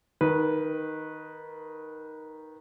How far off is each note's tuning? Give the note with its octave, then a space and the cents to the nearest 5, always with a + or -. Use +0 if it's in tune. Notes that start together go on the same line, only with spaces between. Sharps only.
D#3 +0 B4 -15